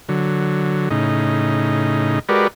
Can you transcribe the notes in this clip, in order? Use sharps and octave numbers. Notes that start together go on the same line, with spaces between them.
D3 F#3
A2 C#3 D#4
G#3 F#4 G4 A#4 B4 D5